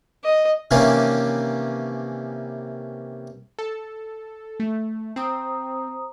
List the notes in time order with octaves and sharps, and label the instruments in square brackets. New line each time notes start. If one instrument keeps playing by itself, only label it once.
[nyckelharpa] D#5
[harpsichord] C3 D#3 E3 A#3 C#4 D4
[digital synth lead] A4
A3
[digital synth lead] C4 [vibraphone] C5 A#5 D#6